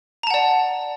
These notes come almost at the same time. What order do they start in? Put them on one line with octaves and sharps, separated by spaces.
A#5 A5 F#5 D5